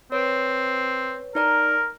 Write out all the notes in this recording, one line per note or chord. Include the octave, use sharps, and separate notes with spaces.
C4 B4 C#5
D#4 A#4 D5 A#5